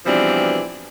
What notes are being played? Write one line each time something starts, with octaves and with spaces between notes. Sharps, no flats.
B2 E3 F3 G3 C4 D4